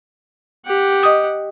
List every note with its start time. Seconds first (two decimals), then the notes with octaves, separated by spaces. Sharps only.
0.66 G4 F#5
1.03 D#5 D#6